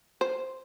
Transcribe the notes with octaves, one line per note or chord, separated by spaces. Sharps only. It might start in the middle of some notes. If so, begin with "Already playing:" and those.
C5